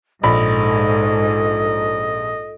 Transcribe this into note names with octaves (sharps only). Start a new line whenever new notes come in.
A#1 G#2 A4 D#5 B5